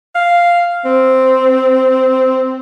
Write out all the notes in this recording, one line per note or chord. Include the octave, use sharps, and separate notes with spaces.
F5
C4